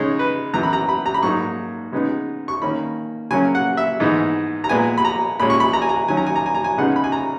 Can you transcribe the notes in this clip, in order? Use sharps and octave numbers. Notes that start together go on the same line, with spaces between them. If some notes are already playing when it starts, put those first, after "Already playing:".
Already playing: C#3 G#3 D#4 C#5
B4
F#2 E3 B3 A#5
B5
A#5
B5
A#5
B5
G#2 F#3 A#3 D#4 C#6
C#3 G#3 B3 D#4
C#6
D#3 A#3 C#4 B5
C#3 F#3 A#3 C#4 G#5
F#5
E5
G#2 E3 B3 D#4
A#5
A#2 G#3 B3 G#5
B5
A#5
A#2 G#3 C#4 B5
C#6
B5
A#5
G#5
A#5
D#3 F#3 C#4 G#5
A#5
G#5
A#5
G#5
A#5
G#5
C#3 G#3 B3 D#4 F#5
B5
G#5
A#5